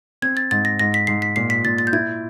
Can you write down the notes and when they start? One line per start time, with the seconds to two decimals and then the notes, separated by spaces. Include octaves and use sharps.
0.22 C4 G#6
0.37 A6
0.51 G#2 A6
0.65 A#6
0.79 G#2 A#6
0.94 B6
1.07 G#2 C7
1.22 B6
1.36 A#2 C7
1.50 B6
1.65 A#2 A6
1.78 A6
1.87 G6
1.93 E4 G#6